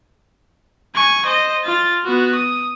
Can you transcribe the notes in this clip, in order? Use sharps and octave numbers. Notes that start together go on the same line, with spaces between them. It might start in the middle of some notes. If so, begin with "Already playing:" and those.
G#5 C#6
C5 D#5
F4 A6
B3 F#4
D#6